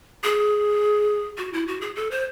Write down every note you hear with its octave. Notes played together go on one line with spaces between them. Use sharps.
G#4
F#4
E4
F#4
G#4
A4
C5